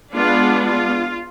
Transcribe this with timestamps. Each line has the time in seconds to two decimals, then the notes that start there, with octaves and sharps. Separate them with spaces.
0.13 G#3 B3 D4 F4
0.67 F4